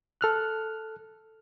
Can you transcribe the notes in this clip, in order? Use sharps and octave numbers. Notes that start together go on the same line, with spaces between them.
A4 F6 F#6